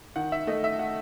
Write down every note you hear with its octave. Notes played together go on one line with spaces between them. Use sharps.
D#3 F#5
E5
A3 D#5
E5
F#5